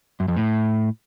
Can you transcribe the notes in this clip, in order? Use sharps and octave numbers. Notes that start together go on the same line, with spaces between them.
F#2
F2
A2